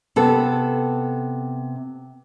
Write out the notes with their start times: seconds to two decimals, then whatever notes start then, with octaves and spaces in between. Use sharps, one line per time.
0.16 C3 B3 A4